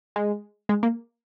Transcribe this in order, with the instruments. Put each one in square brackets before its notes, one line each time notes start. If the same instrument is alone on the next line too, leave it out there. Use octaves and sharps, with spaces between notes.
[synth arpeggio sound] G#3
G#3
A#3